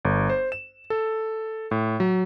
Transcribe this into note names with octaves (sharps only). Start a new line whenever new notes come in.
G1
C5
E7
A4
A2
F#3